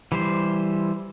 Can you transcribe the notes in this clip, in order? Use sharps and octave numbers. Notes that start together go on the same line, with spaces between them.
E3 G3 C5